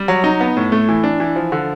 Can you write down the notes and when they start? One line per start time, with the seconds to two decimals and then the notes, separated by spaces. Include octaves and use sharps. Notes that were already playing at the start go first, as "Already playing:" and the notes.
Already playing: G3
0.08 F#3
0.24 D#4
0.40 B3
0.57 A2
0.72 A3
0.89 E3
1.04 D4
1.20 E3
1.36 F3
1.52 D3